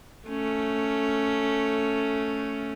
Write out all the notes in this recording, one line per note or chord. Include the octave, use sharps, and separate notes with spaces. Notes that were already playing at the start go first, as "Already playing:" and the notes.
A3 C#4